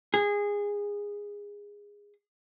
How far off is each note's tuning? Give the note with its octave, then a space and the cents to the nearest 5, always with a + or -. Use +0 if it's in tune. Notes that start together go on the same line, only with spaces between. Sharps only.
G#4 -20